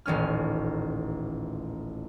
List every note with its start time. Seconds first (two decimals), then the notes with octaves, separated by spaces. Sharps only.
0.06 D#1 A1 C#4 F6